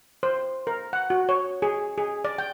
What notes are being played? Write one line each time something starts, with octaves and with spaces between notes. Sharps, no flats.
C5
A#4
F#5
F#4
C#5
G#4
G#4
D5
G5